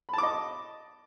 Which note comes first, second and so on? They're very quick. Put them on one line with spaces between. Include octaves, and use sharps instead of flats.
B5 A5 D6 D#5